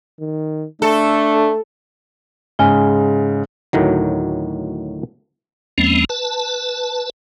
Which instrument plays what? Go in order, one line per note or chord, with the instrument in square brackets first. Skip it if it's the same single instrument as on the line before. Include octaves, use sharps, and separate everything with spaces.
[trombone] D#3
[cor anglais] A3 [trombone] D4 [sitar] A4
[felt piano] G#2 C#3 [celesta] G#5 F6 G7
[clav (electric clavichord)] D2 A2 D#3 F#3
[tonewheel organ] E2 F3 G#3 A#3 C4 C#4
B4 A5